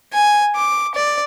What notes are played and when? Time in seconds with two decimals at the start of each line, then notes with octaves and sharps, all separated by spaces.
0.13 G#5
0.55 D6
0.95 D5